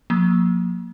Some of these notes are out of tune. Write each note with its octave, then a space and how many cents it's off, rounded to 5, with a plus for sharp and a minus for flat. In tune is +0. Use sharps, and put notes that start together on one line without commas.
F3 +45 A#3 +0